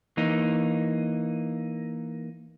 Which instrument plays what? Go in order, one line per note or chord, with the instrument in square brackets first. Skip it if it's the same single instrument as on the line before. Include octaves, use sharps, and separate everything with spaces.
[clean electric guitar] E3 A#3 D#4